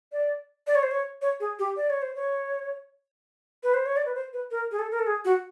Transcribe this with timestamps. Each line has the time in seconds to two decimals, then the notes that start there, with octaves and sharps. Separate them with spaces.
0.12 D5
0.67 D5
0.75 C#5
0.83 C5
0.91 C#5
1.22 C#5
1.40 G#4
1.59 G4
1.77 D5
1.90 C#5
2.02 C5
2.15 C#5
3.63 B4
3.74 C5
3.86 C#5
3.97 D5
4.06 B4
4.15 C5
4.33 B4
4.51 A#4
4.71 G#4
4.79 A4
4.91 A#4
4.99 A4
5.07 G#4
5.25 F#4